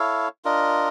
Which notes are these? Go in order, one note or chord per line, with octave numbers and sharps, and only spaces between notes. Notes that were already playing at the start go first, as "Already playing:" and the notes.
Already playing: E4 A4 C#5 F5
D4 F4 A#4 D#5